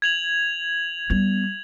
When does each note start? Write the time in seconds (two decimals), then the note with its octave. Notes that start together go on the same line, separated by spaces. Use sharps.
0.02 G#6 F7 F#7
1.10 G3 B3 G#6